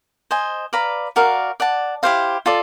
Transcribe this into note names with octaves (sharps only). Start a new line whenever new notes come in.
C5 D#5 G#5
B4 D5 F5 A#5
F#4 A#4 D5 F5
D5 F#5 A5
E4 G4 C5 F5
F4 A4 D5